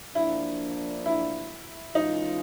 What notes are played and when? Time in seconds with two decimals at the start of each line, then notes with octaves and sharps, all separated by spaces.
0.15 F3 A#3 D4 E4
1.06 E4
1.95 E3 G#3 C#4 D#4 F4